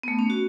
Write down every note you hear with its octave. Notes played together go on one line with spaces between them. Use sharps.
B3
A3
C#4
F#4